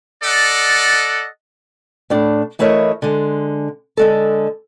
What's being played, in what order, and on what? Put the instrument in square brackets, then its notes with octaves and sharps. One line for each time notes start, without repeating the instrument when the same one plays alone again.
[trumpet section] A4 D5 D#5 F#5
[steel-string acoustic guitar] A2 D4
E3 A3 E4 A#4 C#5 D#5
D3 G#3
D3 G#3 A4